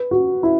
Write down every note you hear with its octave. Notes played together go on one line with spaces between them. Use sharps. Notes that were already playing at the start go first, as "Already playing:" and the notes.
Already playing: B4
F#4
E4